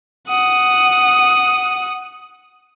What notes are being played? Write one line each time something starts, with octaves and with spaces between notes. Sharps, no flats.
F#5 D#6